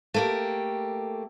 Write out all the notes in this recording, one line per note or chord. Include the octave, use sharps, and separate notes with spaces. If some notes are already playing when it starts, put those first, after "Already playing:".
A3 A#3 G4